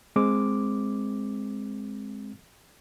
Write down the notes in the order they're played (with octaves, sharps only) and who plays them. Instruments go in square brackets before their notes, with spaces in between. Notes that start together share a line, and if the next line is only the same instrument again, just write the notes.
[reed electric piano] G#3 C4 D6